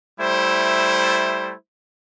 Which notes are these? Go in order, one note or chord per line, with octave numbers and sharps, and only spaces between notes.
G3 A3 E4 C5